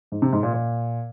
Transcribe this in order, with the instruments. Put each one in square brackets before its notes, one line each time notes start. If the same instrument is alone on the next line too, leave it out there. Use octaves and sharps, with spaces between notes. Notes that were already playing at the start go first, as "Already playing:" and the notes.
[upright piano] G#2
C3
G#2
A#2
A#2